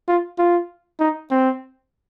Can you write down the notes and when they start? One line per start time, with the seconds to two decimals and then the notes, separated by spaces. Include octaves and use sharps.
0.08 F4
0.39 F4
1.00 D#4
1.31 C4